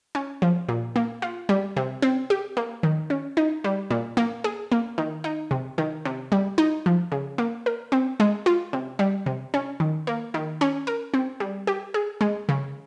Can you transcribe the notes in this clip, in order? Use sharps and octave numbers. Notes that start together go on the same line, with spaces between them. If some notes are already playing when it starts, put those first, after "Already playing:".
C#4
F3
A#2
A#3
F4
G3
C3
C4
G4
A#3
D#3
C#4
D#4
G3
A#2
A#3
G#4
A#3
D#3
D#4
C3
D#3
C3
G3
D#4
F3
C#3
A#3
A#4
C4
G#3
F4
C3
G3
C3
C#4
D#3
A#3
D#3
C#4
A#4
C4
G3
G4
G#4
G#3
C#3